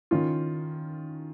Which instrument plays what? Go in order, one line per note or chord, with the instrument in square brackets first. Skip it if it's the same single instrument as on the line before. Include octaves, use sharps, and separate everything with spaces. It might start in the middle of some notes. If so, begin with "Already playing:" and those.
[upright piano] D#3 C#4 F4